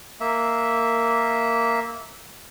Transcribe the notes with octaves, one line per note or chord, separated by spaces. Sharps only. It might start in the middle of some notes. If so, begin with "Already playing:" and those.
A#3 E5